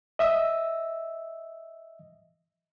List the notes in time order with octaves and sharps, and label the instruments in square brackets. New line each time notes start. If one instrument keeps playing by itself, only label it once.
[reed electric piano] D#5 E5 D#6 E6